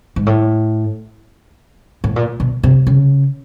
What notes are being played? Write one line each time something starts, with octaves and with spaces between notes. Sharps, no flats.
G#2
A2
A2
A#2
B2
C3
C#3